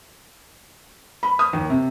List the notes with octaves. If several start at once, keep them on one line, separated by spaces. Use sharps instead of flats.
B5
D#6
D#2
C3